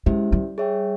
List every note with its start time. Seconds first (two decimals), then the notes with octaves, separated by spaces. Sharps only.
0.06 G#3 C#4 E4 G4 C5 E5
0.32 G3
0.58 G#4 C#5 E5 G5